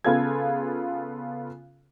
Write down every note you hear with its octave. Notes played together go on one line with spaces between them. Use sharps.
C#3 B3 F4 G#4 A4 G#6